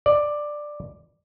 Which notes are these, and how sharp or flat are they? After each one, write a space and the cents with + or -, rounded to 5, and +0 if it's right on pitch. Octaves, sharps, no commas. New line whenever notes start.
D5 +10